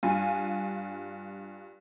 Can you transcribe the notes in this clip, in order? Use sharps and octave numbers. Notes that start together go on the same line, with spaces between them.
G2 F4 G#5